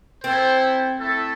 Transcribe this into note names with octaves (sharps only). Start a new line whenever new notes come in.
C4 E4 A4 C5
A3 E4 A4